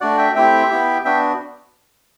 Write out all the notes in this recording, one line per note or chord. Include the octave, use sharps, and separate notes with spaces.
A3 D4 F#4 D5 F#5
E5 G5
A3 C4 E4 G4 E5 G5
B3 E4 G4
B3 D4 F#4 E5 G5